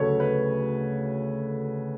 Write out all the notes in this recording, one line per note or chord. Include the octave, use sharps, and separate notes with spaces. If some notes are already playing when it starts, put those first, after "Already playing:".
Already playing: D2 C#3 F#3 A3 A4 B4 C#5
B4